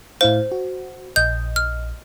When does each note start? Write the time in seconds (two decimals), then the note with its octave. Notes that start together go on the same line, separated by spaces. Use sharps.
0.21 A2 E4 C5 F5
0.52 F#4
1.16 A#1 D#5 G6
1.56 F6